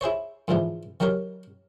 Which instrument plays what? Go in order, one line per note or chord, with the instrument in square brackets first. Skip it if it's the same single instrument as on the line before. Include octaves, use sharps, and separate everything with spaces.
[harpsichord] E4 G#4 C5 C#5
F2 G#2 D3 E3 F3
D#3 F#3 G4 A#4 C#5